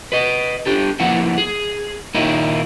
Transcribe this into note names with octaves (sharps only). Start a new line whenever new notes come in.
B4 D#5
D4 G4 A4
F3 A#3 B3 E4 F#5
G#4
A#2 D#3 A#3 D#4 E4